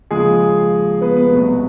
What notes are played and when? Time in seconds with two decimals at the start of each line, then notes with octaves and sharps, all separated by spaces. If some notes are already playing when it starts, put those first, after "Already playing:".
0.11 D#2 C#3 F3 G#3 G#4
1.01 B3 B4
1.16 B3 B4
1.32 C2 B2 F#3 A3